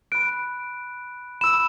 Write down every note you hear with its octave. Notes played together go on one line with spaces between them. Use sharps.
B5 F#6 D7
B5 E6 E7